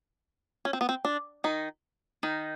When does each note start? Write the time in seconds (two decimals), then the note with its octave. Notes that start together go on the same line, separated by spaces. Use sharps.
0.65 C#4
0.73 C4
0.81 B3
0.89 C4
1.05 D4
1.44 D#3 D#4
2.23 D#3 D#4